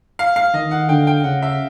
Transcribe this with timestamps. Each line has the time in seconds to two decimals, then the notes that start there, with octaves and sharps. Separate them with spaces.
0.19 F5
0.36 F5
0.54 D#3 D#5
0.71 F#5
0.89 D3 G5
1.07 G5
1.24 C#3 F#5
1.42 E5